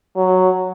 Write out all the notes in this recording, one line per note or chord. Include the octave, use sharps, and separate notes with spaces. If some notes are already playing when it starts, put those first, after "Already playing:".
F#3